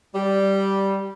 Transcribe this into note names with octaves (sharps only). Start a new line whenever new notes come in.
G3